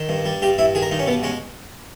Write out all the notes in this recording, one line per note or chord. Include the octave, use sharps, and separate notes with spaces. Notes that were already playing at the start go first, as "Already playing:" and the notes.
Already playing: D#3
G2
G3
G2 G4
G2 E4
D#3 G#4
A#4
G2 D#4
C#4
B2 B3
G#3 C#4